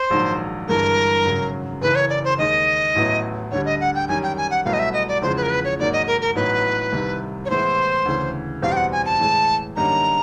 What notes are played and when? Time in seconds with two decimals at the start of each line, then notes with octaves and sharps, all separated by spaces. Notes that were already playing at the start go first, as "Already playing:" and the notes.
Already playing: C5
0.10 A#1 G#2 D#3 F#3
0.68 G1 G2 E3 G#3 A#4
1.24 G#1 F#2 C#3 F#3
1.81 F#1 F#2 C#3 E3 B4
1.95 C#5
2.10 D5
2.24 C5
2.38 D#2 D#3 G#3 D#5
2.95 A1 A2 F#3 B3 E4
3.51 D2 D3 G3 C#5
3.65 D#5
3.81 F#5
3.95 G5
4.08 F#2 D#3 G3 G#5
4.23 G5
4.37 G#5
4.51 F#5
4.65 C2 B2 F#3 A3 F5
4.73 D#5
4.79 E5
4.93 D#5
5.08 D5
5.22 E2 C#3 F3 G#3 C5
5.37 B4
5.43 A#4
5.50 B4
5.65 C#5
5.79 G#1 G#2 D#3 F#3 A#3 D5
5.93 D#5
6.07 A#4
6.21 A#4
6.35 A1 A2 F#3 B3 D#4 B4
6.92 C2 C3 D#3
7.45 C#5
7.50 A2 E3 G#3 B3 E4 C5
8.06 D2 C#3 E3
8.62 E2 B2 G3 C4 F5
8.72 G5
8.77 F#5
8.92 G#5
9.06 A5
9.20 A2 E3 G#3
9.76 F#2 D3 G3 A#3 D#4 A#5